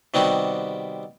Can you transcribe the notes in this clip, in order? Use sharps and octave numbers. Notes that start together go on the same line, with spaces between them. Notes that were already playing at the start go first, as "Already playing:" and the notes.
C3 D#3 G3 B3 C4 F#4